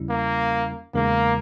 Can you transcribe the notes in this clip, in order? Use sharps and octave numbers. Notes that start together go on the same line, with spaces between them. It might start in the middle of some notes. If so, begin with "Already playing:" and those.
Already playing: E2 C#3 G3 C#4 E4
A#3
E2 C#3 G#3 A#3 D#4 A#4